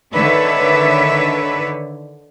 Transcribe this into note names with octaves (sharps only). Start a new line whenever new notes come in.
D3 D#3 D4 B4 C#5 E5